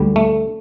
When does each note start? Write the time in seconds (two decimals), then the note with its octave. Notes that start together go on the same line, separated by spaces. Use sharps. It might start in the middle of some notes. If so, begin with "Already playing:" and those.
Already playing: D2 D3 G3
0.16 A3